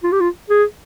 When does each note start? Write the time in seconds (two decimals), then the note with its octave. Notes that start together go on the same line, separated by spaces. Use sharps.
0.04 F4
0.12 G4
0.20 F4
0.50 G#4